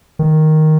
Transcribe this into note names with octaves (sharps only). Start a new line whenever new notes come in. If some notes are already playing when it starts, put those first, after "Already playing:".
D#3